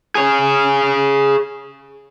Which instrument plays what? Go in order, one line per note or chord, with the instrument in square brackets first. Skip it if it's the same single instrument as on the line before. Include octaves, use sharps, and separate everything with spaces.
[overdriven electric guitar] G#4 C#5